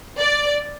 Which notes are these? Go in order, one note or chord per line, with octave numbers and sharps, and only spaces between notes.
D5